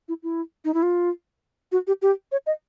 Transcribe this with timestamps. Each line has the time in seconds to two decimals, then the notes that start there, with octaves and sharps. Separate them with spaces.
0.08 E4
0.23 E4
0.65 D#4
0.74 E4
0.83 F4
1.72 F#4
1.87 G4
2.02 G4
2.32 C#5
2.47 D#5